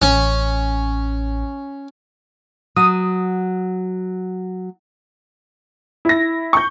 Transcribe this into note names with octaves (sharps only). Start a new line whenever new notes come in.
A1 C#4
F#3 D#6
E4 A#6
C#6 G6